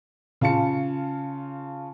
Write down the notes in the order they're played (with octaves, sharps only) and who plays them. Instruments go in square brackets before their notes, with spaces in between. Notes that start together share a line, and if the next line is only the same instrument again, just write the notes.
[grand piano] C#3 F4 A5 C#7